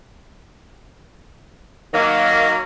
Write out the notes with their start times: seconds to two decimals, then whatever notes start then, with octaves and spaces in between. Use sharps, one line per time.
1.93 D#3 F#3 A#3